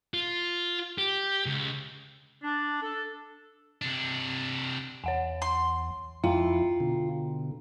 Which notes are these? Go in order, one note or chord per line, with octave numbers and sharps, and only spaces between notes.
F4
G4
C#2
D4
A4
C3 D4
E2 C#5 F#5 G#5
C6
F2 E4 F4 F5 G5 A#5
B2 D3